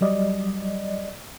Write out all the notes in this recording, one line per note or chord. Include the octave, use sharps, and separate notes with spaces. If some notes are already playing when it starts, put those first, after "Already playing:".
F#3 G3 D5 D#5